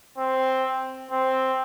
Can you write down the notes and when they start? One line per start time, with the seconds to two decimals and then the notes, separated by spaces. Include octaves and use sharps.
0.17 C4
1.11 C4